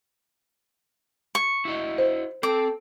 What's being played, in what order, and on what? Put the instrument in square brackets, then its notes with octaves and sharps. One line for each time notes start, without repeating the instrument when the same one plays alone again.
[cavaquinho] C#6
[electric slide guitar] E4 F#4 D#5
[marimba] C5
[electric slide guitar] C4 G5 [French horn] A4 [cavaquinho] D6